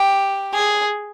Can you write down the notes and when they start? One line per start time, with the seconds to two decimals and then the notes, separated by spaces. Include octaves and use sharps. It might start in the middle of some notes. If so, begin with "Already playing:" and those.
Already playing: G4
0.54 G#4